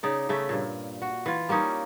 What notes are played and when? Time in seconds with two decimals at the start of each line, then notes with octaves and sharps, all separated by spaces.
0.03 C#3 D#4 D5
0.29 C#3 A3 E5
0.49 G2 A#2
1.02 F#4
1.26 E3 F4
1.49 G3 A#3 C#4 D#4